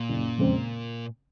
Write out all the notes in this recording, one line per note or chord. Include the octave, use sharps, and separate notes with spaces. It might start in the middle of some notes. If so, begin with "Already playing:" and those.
Already playing: A#2
F#1
F2 C#3 G#3 C4